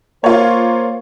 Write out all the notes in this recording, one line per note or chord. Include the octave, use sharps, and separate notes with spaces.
A#3 F4 C5 C#5